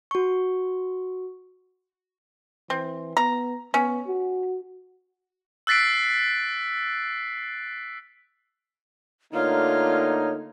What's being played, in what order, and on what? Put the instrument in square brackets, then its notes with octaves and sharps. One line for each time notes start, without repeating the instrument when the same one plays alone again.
[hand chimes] F#4 C#6
[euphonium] E3 [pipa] C4
[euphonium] B3 [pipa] A#5
[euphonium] B3 [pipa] C#4
[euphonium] F#4
[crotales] E6 F#6 A6 B6 C7 D7
[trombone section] D3 A3 A#3 [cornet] D#4 [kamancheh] F4 F6 [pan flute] C#5